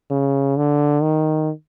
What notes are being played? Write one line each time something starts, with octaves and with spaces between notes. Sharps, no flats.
C#3
D3
D#3